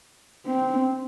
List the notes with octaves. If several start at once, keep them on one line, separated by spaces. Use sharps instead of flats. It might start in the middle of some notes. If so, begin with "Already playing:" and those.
C4